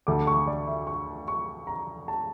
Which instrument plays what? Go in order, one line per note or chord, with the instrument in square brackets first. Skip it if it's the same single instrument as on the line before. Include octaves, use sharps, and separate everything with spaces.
[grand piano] D2 D3 A3 D6
C#6
D5
E5
C#6
C#6
A#5
A5